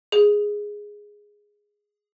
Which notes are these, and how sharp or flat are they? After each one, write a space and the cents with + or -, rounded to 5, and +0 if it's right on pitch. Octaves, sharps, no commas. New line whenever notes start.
G#4 -5